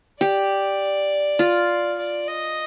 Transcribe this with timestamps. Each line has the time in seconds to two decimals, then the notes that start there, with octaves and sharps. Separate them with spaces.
0.21 G4 D5
1.39 F4
1.98 D5
2.27 D#5